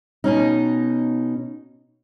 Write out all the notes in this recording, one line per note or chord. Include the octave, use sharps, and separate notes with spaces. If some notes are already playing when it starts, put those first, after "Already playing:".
B2 C#4 D#4